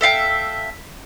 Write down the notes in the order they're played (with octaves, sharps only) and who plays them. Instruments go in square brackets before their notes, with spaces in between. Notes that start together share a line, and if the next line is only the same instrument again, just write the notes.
[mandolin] A4 E5 F5 G5